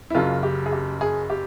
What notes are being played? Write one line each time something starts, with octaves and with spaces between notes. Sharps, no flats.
E4
F#1 F#2 C#3 F4
G4
G#4
G4
G#4
G4